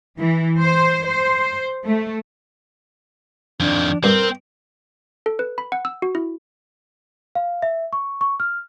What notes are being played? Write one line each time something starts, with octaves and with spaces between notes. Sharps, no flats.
E3
C5
C5
A3
F2 D#3 D4
G2 C4 A#4
A4
B4
B5
F#5
E6
F#4
E4
F5
E5
C#6
C#6
F6